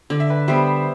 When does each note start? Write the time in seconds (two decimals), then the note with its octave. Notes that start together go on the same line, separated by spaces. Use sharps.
0.10 D3 D5
0.20 E5
0.30 B4 D5
0.48 G3 B3 C5 E5